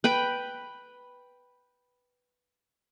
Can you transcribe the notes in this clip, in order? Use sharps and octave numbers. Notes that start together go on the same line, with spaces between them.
B4 G5 B5